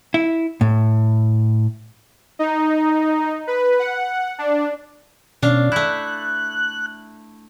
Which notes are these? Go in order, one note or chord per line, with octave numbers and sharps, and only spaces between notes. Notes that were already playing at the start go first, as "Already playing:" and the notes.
E4
A2
D#4
B4
F#5
D4
B2 C#4 D4 F5
A3 E4 F#6